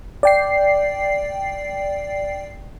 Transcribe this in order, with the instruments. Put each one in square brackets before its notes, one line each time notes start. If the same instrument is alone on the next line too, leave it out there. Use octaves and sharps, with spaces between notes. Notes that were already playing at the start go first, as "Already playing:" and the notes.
[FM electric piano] D5 G5 C7